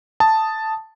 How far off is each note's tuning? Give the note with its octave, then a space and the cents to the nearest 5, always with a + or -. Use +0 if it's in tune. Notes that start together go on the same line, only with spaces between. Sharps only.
A5 +0 D#6 +0